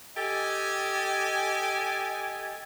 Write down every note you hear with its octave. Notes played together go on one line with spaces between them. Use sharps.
G4 A4 D#5 G#5